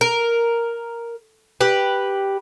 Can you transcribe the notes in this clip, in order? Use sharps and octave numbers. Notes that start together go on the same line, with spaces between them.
A#4
G4 B4